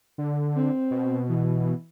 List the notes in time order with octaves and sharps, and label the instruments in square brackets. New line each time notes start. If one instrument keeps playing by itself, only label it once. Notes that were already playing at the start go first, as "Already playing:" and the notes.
[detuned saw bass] D3
[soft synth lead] C4
[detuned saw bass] B2
[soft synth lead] E3